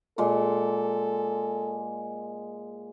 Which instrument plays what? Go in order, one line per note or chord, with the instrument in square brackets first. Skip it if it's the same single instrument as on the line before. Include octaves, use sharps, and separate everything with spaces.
[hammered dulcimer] A#2 G#3 C6 [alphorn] A4